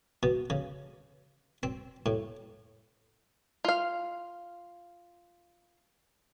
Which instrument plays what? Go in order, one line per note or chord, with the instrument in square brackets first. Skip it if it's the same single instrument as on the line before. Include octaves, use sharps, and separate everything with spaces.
[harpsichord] B2
C#3
C4
A2
[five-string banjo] F4 F5